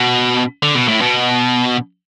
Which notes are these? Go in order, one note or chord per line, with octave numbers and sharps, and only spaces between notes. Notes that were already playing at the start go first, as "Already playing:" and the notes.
Already playing: B2
D3
B2
A2
B2